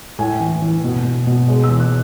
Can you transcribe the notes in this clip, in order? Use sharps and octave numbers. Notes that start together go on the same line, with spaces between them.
A2 G#5
E3
E3
B2
B2
B2
G#3
E6
E3
F#6